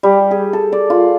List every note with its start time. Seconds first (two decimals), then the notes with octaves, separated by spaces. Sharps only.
0.03 G3
0.31 G#4
0.53 A4
0.72 D5
0.90 F4